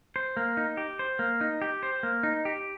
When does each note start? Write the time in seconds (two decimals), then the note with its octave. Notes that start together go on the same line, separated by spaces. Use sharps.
0.16 C5
0.37 A#3
0.57 D#4
0.77 G4
0.99 C5
1.19 A#3
1.41 D#4
1.62 G4
1.83 C5
2.03 A#3
2.23 D#4
2.45 G4